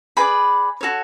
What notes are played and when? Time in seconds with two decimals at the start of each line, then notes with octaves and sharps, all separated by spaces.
0.17 G#4 B4 D5 G#5 B5
0.81 F#4 A4 C#5